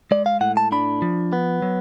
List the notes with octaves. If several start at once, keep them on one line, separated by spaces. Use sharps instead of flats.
G#3 D5
F5
A2 F#5
A5
D4 B5
F3
B3
F#3